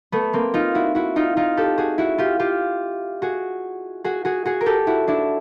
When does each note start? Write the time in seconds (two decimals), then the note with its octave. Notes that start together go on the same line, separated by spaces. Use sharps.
0.12 A3 B3
0.33 A#3 C4
0.54 D#4 F4
0.75 E4 F#4
0.95 E4 F#4
1.16 D#4 F4
1.37 D#4 F4
1.57 G4 A4
1.78 F#4 G#4
1.98 E4 F#4
2.18 F4 G4
2.39 F4 G4
3.22 F#4 G#4
4.04 F#4 G#4
4.25 F#4 G#4
4.46 F#4 G#4
4.61 A#4
4.66 G4 A4
4.87 E4 F#4
5.08 D4 E4